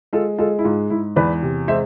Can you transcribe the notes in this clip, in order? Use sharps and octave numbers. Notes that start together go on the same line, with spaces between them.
G#3 F4 A4
G#3 F4 A4
E4
G#2 F4
G#2 E4
E2 B4 D5
C3
G#3 C5 E5